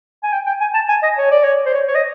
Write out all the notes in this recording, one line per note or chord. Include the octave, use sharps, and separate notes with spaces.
G#5
G5
G5
G#5
A5
G#5
D#5
C#5
D5
C#5
C5
C#5
C#5
D#5